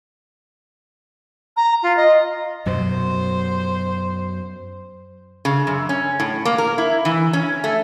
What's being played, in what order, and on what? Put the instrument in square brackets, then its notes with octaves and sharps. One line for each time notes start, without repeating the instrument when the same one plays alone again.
[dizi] A#5
F4
D#5
[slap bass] F#2 B2 F#3 [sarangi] C5
[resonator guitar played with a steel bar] C#3
F#2
C#4
A2
A#3
A#4
E4
E3
C#4
A3